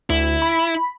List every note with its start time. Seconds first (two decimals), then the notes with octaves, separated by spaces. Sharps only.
0.10 D2 E4
0.42 B5